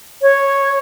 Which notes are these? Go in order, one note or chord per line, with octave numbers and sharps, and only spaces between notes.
C#5